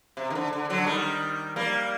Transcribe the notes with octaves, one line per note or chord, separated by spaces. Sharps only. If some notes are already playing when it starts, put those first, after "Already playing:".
C3
D#3
D3
D3
D3 F#3
D#3 G3
G3 A#3